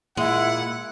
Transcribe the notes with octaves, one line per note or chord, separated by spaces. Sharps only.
A#2 G#3 E4 F#5